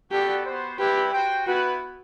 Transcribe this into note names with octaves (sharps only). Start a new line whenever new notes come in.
B3 F#4 G4 A4 D5
B3 F#4 C5
G3 C4 E4 G4 B4
F#4 C5 G5
B3 E4 F#4 B4